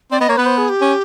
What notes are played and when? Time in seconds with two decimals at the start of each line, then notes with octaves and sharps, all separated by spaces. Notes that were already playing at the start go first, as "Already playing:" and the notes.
0.11 C4 D5
0.20 B3 D#5
0.29 A#3 C#5
0.37 B3 B4
0.46 C5
0.58 G#4
0.69 G4
0.81 C#4